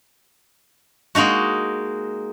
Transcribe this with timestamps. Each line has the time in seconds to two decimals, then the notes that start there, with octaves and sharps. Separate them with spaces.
1.15 G#3 A#3 D#4 F#4